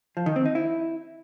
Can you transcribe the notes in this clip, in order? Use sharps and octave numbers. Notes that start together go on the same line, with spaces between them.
F3
D#3
C4
D#4
E4